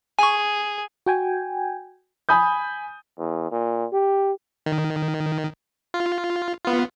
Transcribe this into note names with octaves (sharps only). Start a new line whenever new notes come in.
G#4 G#5 C#6
F#4 G5 G#5
G#5 B5 D#6 G6
E2
A#2
G4
D#3
F4
B3 F4